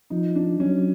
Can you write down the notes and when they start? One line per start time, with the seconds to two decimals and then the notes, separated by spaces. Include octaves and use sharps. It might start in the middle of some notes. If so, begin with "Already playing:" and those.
0.10 F3 D#4
0.35 D4
0.60 F#3 C#4